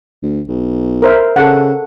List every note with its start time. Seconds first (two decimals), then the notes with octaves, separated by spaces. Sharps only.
0.23 D2
0.48 B1
1.02 A#4 C5 E5
1.36 C#3 A4 F#5